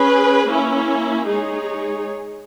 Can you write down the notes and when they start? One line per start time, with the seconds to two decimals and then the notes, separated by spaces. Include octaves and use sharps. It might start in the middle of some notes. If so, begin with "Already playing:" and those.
Already playing: C#4 G#4 B4
0.48 A#3 C#4 E4
1.28 G#3 D#4 G#4 C#5